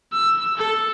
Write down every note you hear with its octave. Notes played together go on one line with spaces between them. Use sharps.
E6
A4